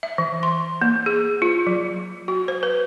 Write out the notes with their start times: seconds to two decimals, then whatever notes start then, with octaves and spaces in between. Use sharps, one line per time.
0.03 E5
0.18 E3
0.43 C6
0.82 A#3
1.06 G#4
1.42 F4
1.67 F#3
2.28 F#4
2.48 C5
2.63 B4